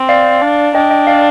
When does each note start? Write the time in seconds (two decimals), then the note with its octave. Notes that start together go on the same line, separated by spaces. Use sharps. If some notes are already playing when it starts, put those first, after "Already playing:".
Already playing: C4
0.09 D5 F5
0.42 D4
0.75 D4 D#5 G5
0.91 D#5 G5
1.07 D5 F5